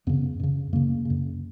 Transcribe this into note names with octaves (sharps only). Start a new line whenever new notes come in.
F#2 C#3 B3
F#2 C#3
F#2 C#3 A#3
F#2 C#3